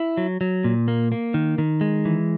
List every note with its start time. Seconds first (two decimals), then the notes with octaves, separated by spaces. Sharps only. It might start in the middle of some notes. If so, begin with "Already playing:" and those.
Already playing: E4
0.17 F#3
0.41 F#3
0.64 A#2
0.88 A#3
1.12 A#3
1.34 D#3
1.58 D#3
1.81 G#3
2.05 E3